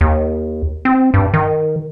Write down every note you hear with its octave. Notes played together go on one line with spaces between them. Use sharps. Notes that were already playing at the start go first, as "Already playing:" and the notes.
D#2
C4
G2
D#3